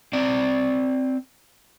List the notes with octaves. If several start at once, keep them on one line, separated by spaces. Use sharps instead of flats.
C4 D5